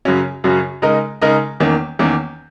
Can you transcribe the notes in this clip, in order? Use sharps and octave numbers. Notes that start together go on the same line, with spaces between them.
F#2 C#3 F#3 C#4 F#4
F#2 C#3 F#3 C#4 F#4
C#3 G#3 D#4 A#4 D#5
C#3 G#3 D#4 A#4 D#5
E2 D#3 A#3 C#4
E2 D#3 A#3 C#4